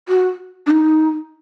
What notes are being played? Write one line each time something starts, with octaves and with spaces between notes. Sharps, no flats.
F#4
D4
D#4